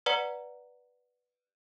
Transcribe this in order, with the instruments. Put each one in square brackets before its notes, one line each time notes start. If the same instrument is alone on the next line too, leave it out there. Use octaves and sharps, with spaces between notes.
[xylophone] B4 D5 F#5 A#5 C#7 G7